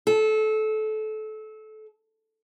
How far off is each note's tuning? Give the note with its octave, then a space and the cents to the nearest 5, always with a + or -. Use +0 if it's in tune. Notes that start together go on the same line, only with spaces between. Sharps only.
A4 -25